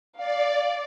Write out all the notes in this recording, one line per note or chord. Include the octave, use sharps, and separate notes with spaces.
D5 F5